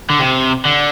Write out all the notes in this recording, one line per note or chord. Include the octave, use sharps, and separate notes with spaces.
D3
C3
D3